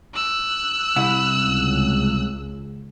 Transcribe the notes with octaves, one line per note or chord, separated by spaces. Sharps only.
E6 F#6
C2 E4
C#2